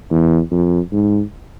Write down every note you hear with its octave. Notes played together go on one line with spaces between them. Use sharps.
E2
F2
G#2